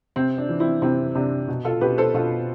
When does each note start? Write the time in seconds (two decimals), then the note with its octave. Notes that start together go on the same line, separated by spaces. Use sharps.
0.16 C3 C4
0.38 D4
0.49 E3
0.60 C4 E4
0.82 C3 C4 E4
1.15 C3 D4
1.48 B2
1.65 F4 A4
1.81 B2 G4 B4
1.98 A4 C5
2.14 B2 F4 A4